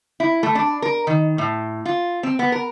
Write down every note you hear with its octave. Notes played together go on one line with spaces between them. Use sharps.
E4
A3
D4
A#4
D#3
A2
F4
C4
B3
A#4